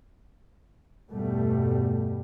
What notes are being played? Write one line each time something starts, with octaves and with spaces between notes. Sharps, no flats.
E2 G2 B2 G3 A3